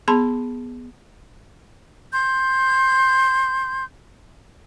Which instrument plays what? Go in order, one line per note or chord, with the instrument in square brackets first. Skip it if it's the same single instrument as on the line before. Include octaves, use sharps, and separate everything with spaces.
[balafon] B3 G#4 A5 B5 C6
[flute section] C6 G6